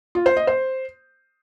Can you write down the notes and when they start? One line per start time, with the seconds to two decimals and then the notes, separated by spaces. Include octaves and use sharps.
0.15 F4
0.26 C5
0.37 D#5
0.47 C5